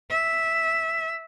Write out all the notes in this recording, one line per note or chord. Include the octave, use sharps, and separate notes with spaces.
E5